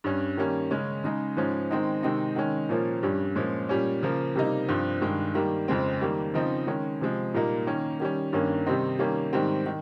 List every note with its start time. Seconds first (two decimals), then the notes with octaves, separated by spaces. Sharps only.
0.04 G2 G3 C#4
0.37 D#3 G3 A#3 C#4
0.71 C#3 G#3 C#4
1.04 C#3 G#3 D#4
1.37 G#2 F3 G#3 C#4
1.71 D#3 G#3 C4 D#4
2.03 C3 D#3 G#3 C4 D#4
2.36 D#3 G#3 C#4
2.69 A#2 F3 A#3 C#4
3.03 G2 G3 C#4
3.36 A#2 F3 G#3 C#4
3.69 A#2 G3 C#4
4.03 C#3 F3 A#3
4.35 C3 G3 A#3 D#4
4.69 G2 F3 C4
5.02 G2 D#3 G#3
5.35 D#3 G3 A#3
5.68 F2 C#3 G#3 C4
6.01 D#3 G3 A#3
6.34 C#3 F3 C4 D#4
6.67 D#3 G#3 C#4
7.01 C3 F3 G#3
7.34 A#2 G3 A#3 D#4
7.67 D#3 A#3 C#4
8.00 D#3 G3 C#4
8.33 G2 D#3 A#3 C#4
8.66 C3 D#3 G3 C4 D#4
8.99 D#3 G3 A#3 C#4
9.33 G#2 D#3 G3 C4
9.66 D#3